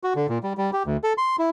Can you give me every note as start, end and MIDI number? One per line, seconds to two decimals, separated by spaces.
0.04 0.13 66
0.16 0.27 50
0.29 0.38 46
0.43 0.53 55
0.58 0.71 55
0.73 0.83 67
0.86 0.97 38
1.04 1.13 69
1.18 1.36 84
1.39 1.50 64